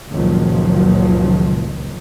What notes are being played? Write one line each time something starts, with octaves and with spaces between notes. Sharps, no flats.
F#1 C#2 A#2 D#3 F3 F#3